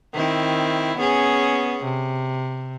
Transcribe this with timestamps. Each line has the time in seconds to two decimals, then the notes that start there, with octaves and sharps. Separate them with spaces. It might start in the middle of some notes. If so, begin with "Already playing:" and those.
0.13 D#3 C4 E4
0.98 B3 C#4 G#4
1.84 C3